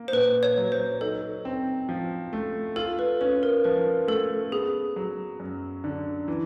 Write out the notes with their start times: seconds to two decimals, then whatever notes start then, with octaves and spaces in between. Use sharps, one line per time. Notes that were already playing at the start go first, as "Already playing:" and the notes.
Already playing: A#3
0.08 C5
0.13 A#2 B4
0.43 C#5
0.58 F#3
0.72 C5
1.01 D#4 A4
1.45 C4
1.89 F3
2.33 A3
2.76 F4 A4
2.99 B4
3.21 C#4 B4
3.43 A#4
3.65 F3 B4
4.08 A3 A4
4.52 B3 G#4
4.96 F#3
5.40 F#2
5.84 D3
6.28 E3